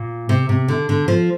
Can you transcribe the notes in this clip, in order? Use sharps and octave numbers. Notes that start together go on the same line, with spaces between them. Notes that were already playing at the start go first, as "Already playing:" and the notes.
Already playing: A#2
C3
C3
D3
D3
F3